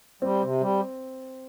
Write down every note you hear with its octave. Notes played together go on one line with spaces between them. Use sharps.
G3 C4
C3
G3